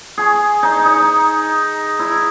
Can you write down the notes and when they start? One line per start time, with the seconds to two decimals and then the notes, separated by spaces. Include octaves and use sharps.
0.18 G#4
0.63 D#4
0.85 D#4
1.99 E4